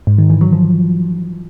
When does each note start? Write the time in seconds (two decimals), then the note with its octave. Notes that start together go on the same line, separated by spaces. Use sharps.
0.07 G#2
0.18 D#3
0.30 E3
0.41 F#3
0.52 F3